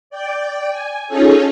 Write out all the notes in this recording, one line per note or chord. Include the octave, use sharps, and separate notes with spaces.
D5 G5
G#5
C#4 D#4 F4 G#4 A4 C#5